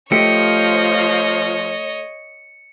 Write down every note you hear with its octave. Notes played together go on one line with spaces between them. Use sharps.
F3 A3 G4 C#5 D#5 C#7